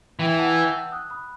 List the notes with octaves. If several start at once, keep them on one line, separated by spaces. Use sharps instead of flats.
E3 E5 G5
F#5 A5
E6 G6
D#6 F#6
B5 D#6